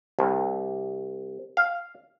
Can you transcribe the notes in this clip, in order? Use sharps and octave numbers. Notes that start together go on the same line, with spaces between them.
C2
F5